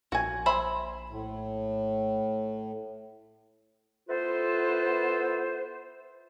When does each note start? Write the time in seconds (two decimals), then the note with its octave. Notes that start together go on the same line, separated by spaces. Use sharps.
0.12 A#1 F#4 G#5
0.46 C5 E5 B5
1.10 A2
4.08 B3 E4 F4 A4 B4 C5